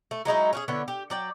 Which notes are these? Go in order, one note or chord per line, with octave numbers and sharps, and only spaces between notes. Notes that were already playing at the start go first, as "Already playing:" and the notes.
A3
F#3 G#3 D#4 E4
C#4 F#4 G#4
D3 B3 E4 C#5
G4
F#3 D5 G5